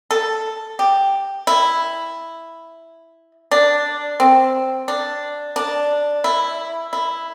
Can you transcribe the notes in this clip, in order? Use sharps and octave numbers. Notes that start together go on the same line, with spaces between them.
A4
G4
E4
D4
C4
D4
D4
E4
E4